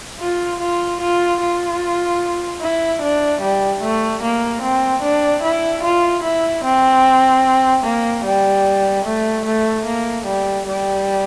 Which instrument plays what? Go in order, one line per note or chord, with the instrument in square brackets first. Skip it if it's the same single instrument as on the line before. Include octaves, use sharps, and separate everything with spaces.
[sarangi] F4
F4
F4
F4
E4
D4
G3
A3
A#3
C4
D4
E4
F4
E4
C4
A#3
G3
A3
A3
A#3
G3
G3